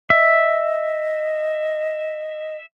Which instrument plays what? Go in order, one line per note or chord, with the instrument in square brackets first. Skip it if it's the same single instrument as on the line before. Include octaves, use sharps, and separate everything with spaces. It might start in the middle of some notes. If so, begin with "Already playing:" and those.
[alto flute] D#5 [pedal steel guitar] E5